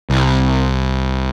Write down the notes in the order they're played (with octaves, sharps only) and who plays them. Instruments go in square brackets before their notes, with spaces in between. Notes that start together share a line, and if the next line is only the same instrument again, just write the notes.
[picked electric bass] C2